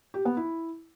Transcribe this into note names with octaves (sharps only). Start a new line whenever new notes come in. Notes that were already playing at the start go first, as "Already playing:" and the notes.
G4
B3
E4